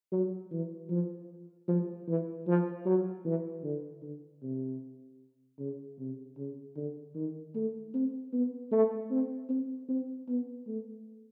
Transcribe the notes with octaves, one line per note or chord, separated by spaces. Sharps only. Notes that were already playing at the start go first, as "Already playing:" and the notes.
F#3
E3
F3
F3
E3
F3
F#3
E3
D3
D3
C3
C#3
C3
C#3
D3
D#3
A3
C4
B3
A3
C4
C4
C4
B3
A3